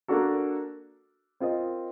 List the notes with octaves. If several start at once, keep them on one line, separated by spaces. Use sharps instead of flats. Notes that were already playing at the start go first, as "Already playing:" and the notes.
A#3 D4 F#4 A4
C4 F4 A#4 D#5